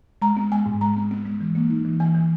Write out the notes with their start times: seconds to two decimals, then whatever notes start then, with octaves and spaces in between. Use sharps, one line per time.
0.22 G#3 A#5
0.37 B3
0.52 G#3 G#5
0.66 G#2
0.81 G#3 A#5
0.97 B3
1.11 B3
1.26 G#3
1.41 E3
1.55 A#3
1.70 D#4
1.85 E3
2.00 E3 G#5
2.14 E3